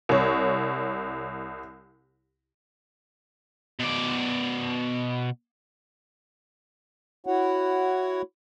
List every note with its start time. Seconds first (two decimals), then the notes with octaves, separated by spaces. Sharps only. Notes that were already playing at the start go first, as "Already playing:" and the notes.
0.09 C2 C#5
3.79 B2 D5
7.27 E4 F#4 C#5 F#5